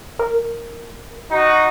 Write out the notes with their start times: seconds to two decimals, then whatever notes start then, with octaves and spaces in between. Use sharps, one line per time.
0.19 A#4
1.30 D#4 F#4